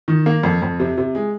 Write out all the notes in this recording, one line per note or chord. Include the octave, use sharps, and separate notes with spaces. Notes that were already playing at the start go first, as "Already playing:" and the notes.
D#3
A#3
F2
F2
C3
C3
G#3